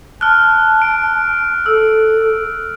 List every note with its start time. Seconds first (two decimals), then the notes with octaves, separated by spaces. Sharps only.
0.21 A5 F6 F#6
0.82 D7
1.66 A4 E6